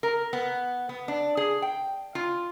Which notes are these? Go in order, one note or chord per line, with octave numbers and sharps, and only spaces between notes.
A#4
B3
B3
D4
G#4
G5
F4